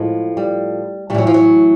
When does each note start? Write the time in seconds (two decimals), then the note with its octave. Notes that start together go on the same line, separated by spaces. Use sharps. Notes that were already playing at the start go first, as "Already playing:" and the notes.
Already playing: A2 F3 G#3
0.37 G3
1.10 A2 G3
1.14 E3 F#3
1.27 F3
1.34 F#3